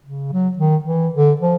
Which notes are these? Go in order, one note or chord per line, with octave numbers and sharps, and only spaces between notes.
C#3
F#3
D#3
E3
D3
F3